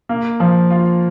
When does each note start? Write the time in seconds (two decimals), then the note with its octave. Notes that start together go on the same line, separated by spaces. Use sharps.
0.09 A#3
0.40 F3
0.70 F4